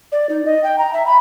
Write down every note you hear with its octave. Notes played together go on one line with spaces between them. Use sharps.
D5
D#4
D#5
G5
A#5
E5
B5